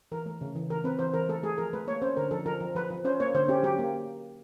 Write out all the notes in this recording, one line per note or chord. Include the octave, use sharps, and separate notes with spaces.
E3 A#4
A3
C#3
E3
E3 A#4
C4 B4
E3 C5
E3 A#4
A3 A4
A3 G#4
F3 A#4
A3 B4
A#3 C#5
C#4 C5
D3 A#4
F3 A4
F3 A#4
F3
F3 B4
F3
C#4 C5
A#3 C#5
D3 C5
C#4 G4
F#3 G4
A#3